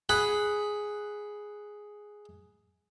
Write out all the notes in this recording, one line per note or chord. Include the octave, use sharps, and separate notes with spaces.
G#4 F#5 B5